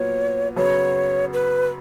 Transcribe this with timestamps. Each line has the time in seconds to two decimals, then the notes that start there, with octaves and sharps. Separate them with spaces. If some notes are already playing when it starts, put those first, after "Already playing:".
Already playing: A#2 F#3 B3 F4 C#5
0.56 F#2 C#3 F#3 B3 C#5
1.33 B4